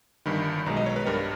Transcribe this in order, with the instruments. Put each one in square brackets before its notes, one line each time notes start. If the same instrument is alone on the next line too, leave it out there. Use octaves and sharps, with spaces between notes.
[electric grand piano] G1 G2 D#3 B5
B1 B2 G#3 A#5
D#5
C#5
B4
G2 G3 A#4